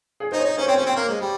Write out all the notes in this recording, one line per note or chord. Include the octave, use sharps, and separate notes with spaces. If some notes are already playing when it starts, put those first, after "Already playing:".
G#4
D#4 C5
C#5
D#4
C#4 C5
C4 C#5
C#4 C5
C4
A#3
G#3
G3